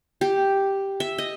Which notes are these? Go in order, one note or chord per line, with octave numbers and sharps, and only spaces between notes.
G4
E5
D#5